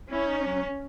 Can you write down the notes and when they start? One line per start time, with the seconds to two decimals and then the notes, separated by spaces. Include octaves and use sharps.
0.12 C#4 E4
0.30 D#4
0.46 F#3